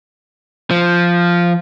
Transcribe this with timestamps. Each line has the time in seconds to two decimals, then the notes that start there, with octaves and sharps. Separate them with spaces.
0.71 F3